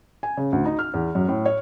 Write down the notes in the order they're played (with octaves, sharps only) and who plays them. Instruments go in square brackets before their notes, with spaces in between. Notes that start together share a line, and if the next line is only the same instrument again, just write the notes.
[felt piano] G#5
C#3
D2
D#4
F6
E2
F#2
A2
C#5